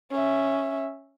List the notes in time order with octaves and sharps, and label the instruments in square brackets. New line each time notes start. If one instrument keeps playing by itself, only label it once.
[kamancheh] C#4 E5